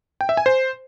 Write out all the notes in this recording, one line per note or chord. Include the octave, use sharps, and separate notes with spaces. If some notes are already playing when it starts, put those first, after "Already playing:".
G5
E5
G#5
C5